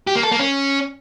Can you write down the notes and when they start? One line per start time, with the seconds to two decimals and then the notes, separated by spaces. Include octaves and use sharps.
0.07 G4
0.15 A#3
0.23 A4
0.31 A#3
0.40 C#4